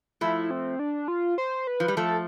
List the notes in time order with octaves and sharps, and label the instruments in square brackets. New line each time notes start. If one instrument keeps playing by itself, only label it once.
[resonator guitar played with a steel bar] F3 A3 [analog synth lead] E4
[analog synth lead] C4
D4
F4
C5
B4
[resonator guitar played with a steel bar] F3
G3
[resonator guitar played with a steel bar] F3 A3 [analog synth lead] A4